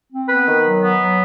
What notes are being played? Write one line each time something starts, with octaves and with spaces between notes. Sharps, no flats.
C4
B3 B4
D#3
F#3
B3
F#3